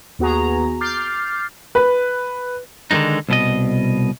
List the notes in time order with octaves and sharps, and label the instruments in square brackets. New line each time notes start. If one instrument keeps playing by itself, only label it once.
[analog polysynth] D#2 B3 F#4 G#4 A#5
D6 F6 G6 A6 C7
[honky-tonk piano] B4
[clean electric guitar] D3 D#3 F3 G#3 D#4
C2 B2 D#5